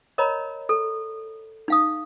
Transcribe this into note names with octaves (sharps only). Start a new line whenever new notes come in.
A#4 C#5 D#5 A#5 B5
A4
D#4 F5 D#6